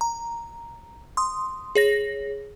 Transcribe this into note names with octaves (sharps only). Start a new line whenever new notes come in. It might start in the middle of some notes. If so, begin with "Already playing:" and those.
A#5
C6 D#6
G#4 C#5 A#6